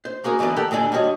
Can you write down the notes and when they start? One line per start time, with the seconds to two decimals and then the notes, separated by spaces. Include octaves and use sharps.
0.05 C5
0.24 A#3 F#4 G#4 A#4
0.39 D3 E3 A#3 B3 D5
0.56 G4 A4 A#4 D5 F#5 G5
0.71 D#2 A#2 D3 D5 G#5
0.92 G3 D4 F#4 C#5 D#5